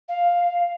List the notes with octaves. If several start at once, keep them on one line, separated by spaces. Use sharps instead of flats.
F5